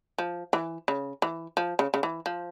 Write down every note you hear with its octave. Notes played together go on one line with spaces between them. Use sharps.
F3
E3
C#3
E3
F3
C#3
C#3
E3
F3